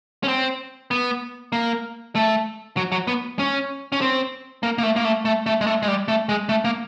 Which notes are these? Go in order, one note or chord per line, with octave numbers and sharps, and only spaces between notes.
C#4
C4
B3
A#3
A3
F#3
F#3
B3
C#4
C#4
C4
A#3
A#3
A3
A#3
A3
A3
A3
G#3
A3
G#3
G3
A3
G#3
A3
A#3